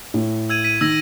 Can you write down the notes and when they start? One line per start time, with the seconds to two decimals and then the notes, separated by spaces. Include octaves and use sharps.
0.14 A2
0.50 E6 G#6 D#7
0.64 B6 D#7
0.81 D#3 E6 G#6 A#6